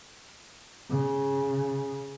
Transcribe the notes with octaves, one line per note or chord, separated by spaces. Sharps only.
C#3